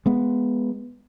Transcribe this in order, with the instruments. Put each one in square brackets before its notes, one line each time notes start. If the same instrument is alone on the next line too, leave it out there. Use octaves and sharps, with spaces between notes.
[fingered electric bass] G#3 B3